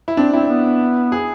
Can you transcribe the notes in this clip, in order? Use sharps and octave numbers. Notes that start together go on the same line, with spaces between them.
E4
C4 D4
C4 E4
B3
G#4